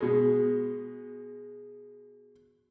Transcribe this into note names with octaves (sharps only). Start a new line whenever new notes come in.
B2 G#3